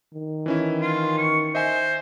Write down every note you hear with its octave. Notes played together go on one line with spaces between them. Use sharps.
D#3
E3 C#4 E4
F4
C#6
C5 D#5 E5 G#5